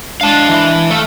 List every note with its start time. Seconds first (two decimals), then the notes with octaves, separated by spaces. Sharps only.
0.21 G#3 D4 F5 A5
0.49 E3
0.90 A3 E5 F5